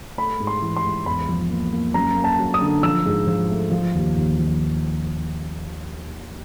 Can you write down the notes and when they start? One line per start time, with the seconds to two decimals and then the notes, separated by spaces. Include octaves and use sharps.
0.17 A3 B5
0.40 G#2
0.47 C6
0.62 E3
0.77 C6
0.84 G#2
1.06 E2 B5
1.29 F3
1.50 A#3
1.73 A#3
1.94 F#2 A#5
2.16 A#3
2.24 A5
2.39 F#3
2.54 D#6
2.62 D3
2.83 F3 E6
3.06 G#2
3.27 F3
3.49 A3
3.72 F3
3.94 D#2
4.16 D#2
4.38 F3